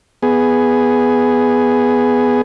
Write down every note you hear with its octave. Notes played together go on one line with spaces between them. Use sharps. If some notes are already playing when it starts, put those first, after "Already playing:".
B3 G#4